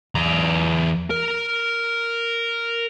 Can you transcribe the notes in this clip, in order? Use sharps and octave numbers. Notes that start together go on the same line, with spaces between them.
E2 A#5
A#4